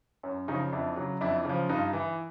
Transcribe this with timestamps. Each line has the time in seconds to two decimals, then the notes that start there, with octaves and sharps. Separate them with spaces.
0.23 F#2 C#4
0.48 C#3 F3 C#4 D#4
0.72 F2 D4 E4
0.96 C#3 F#3
1.21 F2 D4 E4
1.45 C#3 F3
1.69 G2 D#4 F4
1.93 E3